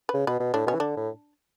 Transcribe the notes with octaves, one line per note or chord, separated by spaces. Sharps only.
C#3 B4
B2 B4
B2
A2 D4
B2 C#4
E3
D3 D4
A2